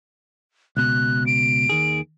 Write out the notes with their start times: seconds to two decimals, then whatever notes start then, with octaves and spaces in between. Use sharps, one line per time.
0.77 C#2 B2 F#6
1.26 D7
1.69 D#2 D#3 G#4